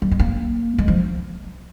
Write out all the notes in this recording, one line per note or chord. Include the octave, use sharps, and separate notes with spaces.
G3
G#3
A#3
G#3
F3